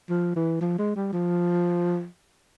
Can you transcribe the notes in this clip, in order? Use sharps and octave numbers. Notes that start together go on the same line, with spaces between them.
F3
E3
F3
G#3
G3
F3